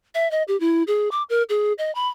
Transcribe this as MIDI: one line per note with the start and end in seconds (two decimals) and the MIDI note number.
0.15 0.30 76
0.31 0.43 75
0.48 0.59 67
0.60 0.83 64
0.87 1.09 68
1.11 1.23 86
1.30 1.43 70
1.49 1.73 68
1.78 1.93 75
1.95 2.08 83